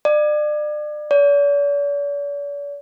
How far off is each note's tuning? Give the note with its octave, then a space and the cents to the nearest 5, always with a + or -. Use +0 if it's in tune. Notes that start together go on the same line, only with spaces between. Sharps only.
D5 +35
D5 -45